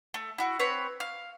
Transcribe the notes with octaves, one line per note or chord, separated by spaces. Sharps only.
A3
E4 F#4
C4 B4 C#5
F5